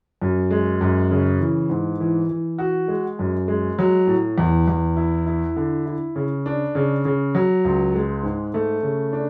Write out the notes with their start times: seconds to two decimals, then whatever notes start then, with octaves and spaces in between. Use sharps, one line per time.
0.22 F#2
0.51 G#3
0.81 F#2
1.11 C#3
1.40 E3
1.69 G#2
2.00 E3
2.30 E3
2.58 F#4
2.88 G#3
3.19 F#2
3.48 G#3
3.79 F#3
4.07 A2
4.38 E2
4.68 E2
4.97 E4
5.26 E4
5.56 D3
5.86 E4
6.16 C#3
6.46 D4
6.75 C#3
7.05 C#3
7.35 F#3
7.65 C#2
7.95 G#3
8.23 G#2
8.54 A3
8.83 C#3
9.13 D4